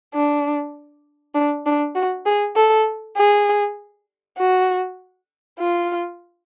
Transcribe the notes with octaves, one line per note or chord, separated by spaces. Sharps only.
D4
D4
D4
F#4
G#4
A4
G#4
F#4
F4